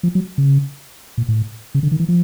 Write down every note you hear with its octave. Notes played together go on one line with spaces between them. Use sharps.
F3
F#3
C#3
A#2
A2
C#3
D3
D#3
E3
F3